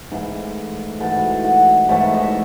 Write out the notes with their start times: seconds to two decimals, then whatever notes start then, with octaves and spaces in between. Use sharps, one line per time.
0.12 G#2 E3 A3 E4 G#4
1.00 G#2 E3 A3 F#4 A4
1.44 D#5 F#5
1.88 G#2 E3 A3 C#5 E5
2.14 D#5
2.23 E5